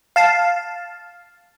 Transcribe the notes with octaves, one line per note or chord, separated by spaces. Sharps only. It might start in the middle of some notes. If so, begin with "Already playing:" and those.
F5 A5